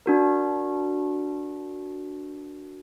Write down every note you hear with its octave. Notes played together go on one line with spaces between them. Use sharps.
D4 F#4 A#4